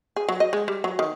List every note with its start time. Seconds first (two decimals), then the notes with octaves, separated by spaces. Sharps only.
0.16 G#4
0.29 F#3
0.40 D#5
0.53 G#3
0.68 G3
0.84 F#3
0.99 D#3